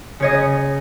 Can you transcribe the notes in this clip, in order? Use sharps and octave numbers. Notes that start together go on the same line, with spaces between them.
C#3 C#5 D#5